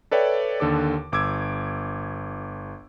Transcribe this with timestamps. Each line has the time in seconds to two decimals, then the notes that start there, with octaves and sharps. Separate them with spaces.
0.11 A4 B4 C#5 D5 E5 G5
0.60 D#2 D3 A4 D6
1.12 G1 D6 E6 G#6 D7